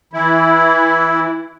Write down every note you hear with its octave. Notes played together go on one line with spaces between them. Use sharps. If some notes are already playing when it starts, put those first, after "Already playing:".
E3 E4